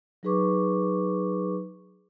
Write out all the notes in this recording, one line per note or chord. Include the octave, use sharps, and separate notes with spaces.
F#3 D#4 G#4 B4 C#6 D6